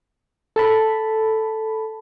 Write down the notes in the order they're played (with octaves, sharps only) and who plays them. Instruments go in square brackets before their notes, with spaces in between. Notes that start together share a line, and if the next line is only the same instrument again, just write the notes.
[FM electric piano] A4 A5 B5